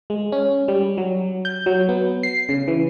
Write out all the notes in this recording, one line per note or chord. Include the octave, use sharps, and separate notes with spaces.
G#3
C#4
G3
F#3
G6
F#3
B3
C7
C#3
E3